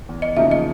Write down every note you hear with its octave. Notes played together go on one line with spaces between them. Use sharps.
E2
D#5
C#3 F3 A#3 D#4 E5
D#5